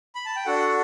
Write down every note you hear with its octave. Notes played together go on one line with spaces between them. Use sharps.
B5
A5
G5
D4 F#4 A4 F#5